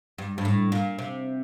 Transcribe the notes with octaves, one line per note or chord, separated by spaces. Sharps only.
G2
G2
A2
A#2
C3